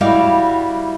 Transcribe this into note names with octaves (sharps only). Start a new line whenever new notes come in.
G3 E4 F#4 D5 F5